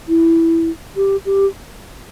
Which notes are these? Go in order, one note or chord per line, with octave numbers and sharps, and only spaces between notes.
E4
G4
G4